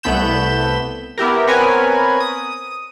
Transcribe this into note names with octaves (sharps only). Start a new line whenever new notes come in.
C2 A3 B3 B5 G6 E7
B3 E4 G4 A#4
B3 C4 A#4 B4 C#5 G#5
D#6